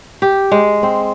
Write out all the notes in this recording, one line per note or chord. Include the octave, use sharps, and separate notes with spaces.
G4
G#3
C4